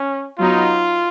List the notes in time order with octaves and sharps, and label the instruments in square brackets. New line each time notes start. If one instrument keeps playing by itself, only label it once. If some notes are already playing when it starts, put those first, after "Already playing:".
Already playing: [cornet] C#4
[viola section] F#3 B3 D#4 [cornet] F4